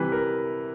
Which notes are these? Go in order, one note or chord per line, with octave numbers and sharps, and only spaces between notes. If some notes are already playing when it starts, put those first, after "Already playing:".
Already playing: C3 E3 G3 B4
A#4